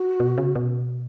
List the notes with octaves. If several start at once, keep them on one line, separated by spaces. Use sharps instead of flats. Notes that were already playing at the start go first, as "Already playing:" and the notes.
Already playing: F#4
B2
C#3
B2